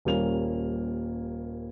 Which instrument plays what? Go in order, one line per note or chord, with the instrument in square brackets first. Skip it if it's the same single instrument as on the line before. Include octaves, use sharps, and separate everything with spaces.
[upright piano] D#1 G3 A#3 C#4 F7